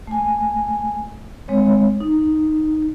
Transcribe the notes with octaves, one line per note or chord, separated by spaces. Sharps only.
A3 G#5
G#3 C4 C#5
D#4